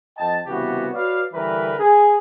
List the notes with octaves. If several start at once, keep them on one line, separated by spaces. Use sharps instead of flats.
F2 D#5 G5 A5
C2 C#3 E3 B3 F#4 G4
F#4 B4 C#5 D5 F5
D3 E3 G3 A#4 B4
G#4